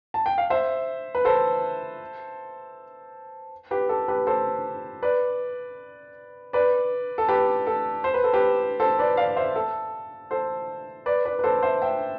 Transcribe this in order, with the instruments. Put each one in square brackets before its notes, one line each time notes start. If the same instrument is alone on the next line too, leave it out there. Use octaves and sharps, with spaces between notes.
[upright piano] A5
G5
F5
C5 E5
B4
A4 C5
G4 B4
A4
G4 B4
A4 C5
B4 D5
B4 D5
A4
G4 B4
A4
C5
B4
A4
G4 B4
A4 C5
B4 D5
D5 F5
C5 E5
A4
A4 C5
B4 D5
B4 D5
B4
A4 C5
C5 E5
E5 G5